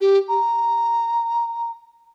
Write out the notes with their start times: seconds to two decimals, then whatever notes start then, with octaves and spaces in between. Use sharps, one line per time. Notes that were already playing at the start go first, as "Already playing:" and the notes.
0.01 G4
0.29 A#5